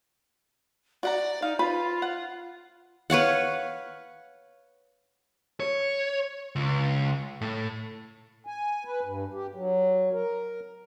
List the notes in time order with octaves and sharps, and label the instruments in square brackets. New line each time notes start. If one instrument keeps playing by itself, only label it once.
[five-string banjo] F#4 F#5 A#5 [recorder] D5
[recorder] D#4 [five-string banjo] F5
[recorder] F4 [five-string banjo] B4 C5 B5
[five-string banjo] F#5
[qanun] B4 C#5 F5 F#5
[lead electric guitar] C#5
C#2
A2
[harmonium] G#5
B4
G2
G4
F#3
A#4